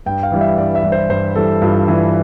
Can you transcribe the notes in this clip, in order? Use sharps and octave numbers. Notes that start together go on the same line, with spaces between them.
G2 G5
F5
E3 G3
E5
G2 D5
E5
E3 G3
C5
G2 C5
E3 G3 A4
G2 F4
E3 G3